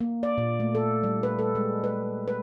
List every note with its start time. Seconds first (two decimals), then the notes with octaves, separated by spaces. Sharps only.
0.01 A#3
0.23 D5
0.38 A#2
0.60 A3
0.75 A4
1.03 G3
1.23 B4
1.39 A4
1.55 G#3
1.84 B4
2.28 B4